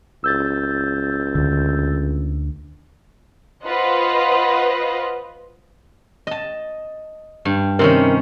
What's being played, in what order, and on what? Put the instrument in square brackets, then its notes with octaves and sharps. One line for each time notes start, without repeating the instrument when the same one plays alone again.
[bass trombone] C#2 [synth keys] E6 G6 A6
[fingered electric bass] D2 D3
[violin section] F4 B4 C5 D#5 F#5
[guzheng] D#5 A5
G2
[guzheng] C3 D#3 C#4 [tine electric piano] A#4